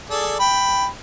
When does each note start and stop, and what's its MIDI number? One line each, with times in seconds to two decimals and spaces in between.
0.10 0.36 68
0.10 0.36 69
0.10 0.36 74
0.40 0.86 79
0.40 0.86 83